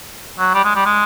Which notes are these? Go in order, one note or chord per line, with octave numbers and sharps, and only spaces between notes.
F#3
G3
G#3
G3
G#3